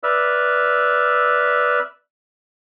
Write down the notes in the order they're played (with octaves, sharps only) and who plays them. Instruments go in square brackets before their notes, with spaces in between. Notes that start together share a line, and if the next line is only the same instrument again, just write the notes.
[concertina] B4 D5 E5 E6 F6